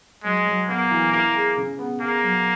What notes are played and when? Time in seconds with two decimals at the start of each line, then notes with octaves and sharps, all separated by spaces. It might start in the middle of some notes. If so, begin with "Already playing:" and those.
0.24 F#3 G#3
0.47 F#3
0.68 A#3 B3
0.91 E3
1.12 A#3 E4
1.34 G#4
1.57 C#3
1.78 B3
2.00 A#3 G#4
2.23 F#3